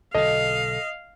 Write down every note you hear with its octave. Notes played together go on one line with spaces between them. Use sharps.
B1 B2 D3 A4 D#5 F5